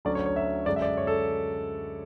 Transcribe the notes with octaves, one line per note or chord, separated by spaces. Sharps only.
D2 D3 F#3 C#4 D5
C#5
C#5
E5
F#2 D3 G#3 D4 D5
E5
D5
C#5
A4